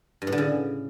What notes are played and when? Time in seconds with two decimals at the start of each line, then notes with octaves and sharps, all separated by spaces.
0.22 G2
0.27 A2
0.32 D3
0.38 C#3